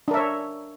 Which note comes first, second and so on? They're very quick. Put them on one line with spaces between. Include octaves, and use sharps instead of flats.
D4 A#4 E5 C#5